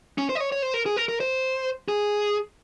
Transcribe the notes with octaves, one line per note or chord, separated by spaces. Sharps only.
C#4
C5
D#5
C#5
C#5
C5
A#4
G#4
A#4
A#4
C5
G#4